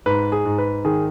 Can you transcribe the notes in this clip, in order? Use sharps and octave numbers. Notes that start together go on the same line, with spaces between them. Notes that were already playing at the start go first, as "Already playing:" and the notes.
G#2 B4
G#4
G#2
B4
D#3 G#4